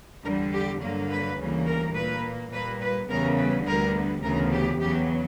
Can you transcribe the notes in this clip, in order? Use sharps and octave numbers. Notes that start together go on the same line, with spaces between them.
E2 D3 G3 A#4
G4
G2 D3 F#3 A#3
B4
D2 C#3 E3 G3 A#3
A#4
A#2 A#3 B4
A#2 G3 A#3 B4
B4
E2 C#3 E3 G3 B3 A#4
B4
D2 D3 G3 B3 A#4
D2 C#3 E3 B3 A#4
G4
E2 C#3 F#3 B3 G4